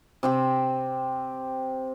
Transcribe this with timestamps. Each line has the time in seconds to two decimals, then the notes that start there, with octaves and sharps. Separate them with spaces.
0.23 C3 C4 G4